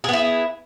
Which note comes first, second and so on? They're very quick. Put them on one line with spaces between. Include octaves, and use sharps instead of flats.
G#4 B3 E4